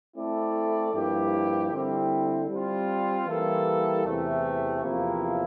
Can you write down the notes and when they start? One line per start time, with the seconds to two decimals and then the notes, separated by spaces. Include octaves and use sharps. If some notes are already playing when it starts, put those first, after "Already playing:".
0.16 A3 C4 E4 A4 D5
0.94 G2 F3 A#3 E4 G4
1.71 D3 G3 C4 E4
2.50 G3 C4 F4
3.27 E3 G3 A#3 E4 A4
4.04 E2 C3 E3 A3
4.82 E2 C3 F3 A#3 E4